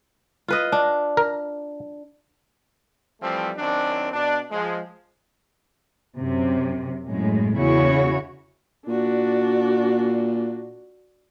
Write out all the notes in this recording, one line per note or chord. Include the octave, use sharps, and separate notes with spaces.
F4 B4 D#5
D4
A#4
E3 F3 G3 A3 C4
F#2 D#3 C4 D4
B2 D4
F3 G#3
F#2 C3
F#2 A2 G#3
E2 C#3 E4 F#4 C#5
A#2 D4 F#4